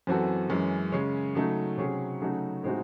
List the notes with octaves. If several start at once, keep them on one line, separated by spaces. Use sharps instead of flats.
F#2 E3 C4 F#4 A4
F#2 E3 G#3 C#4
C#3 G#3 C#4
C#3 F#3 A3 D#4
C3 F#3 C#4 G#4
C#3 F#3 A3 D#4 F#4
A2 G#3 C4 D#4 F#4